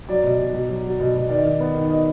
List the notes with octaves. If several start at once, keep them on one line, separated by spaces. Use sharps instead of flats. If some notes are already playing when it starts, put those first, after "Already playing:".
F#3 D5
B2
B2
B2
F#3
F#3
B2
B2
D#3 D5
D#3
B3
D#3
D#3 D#5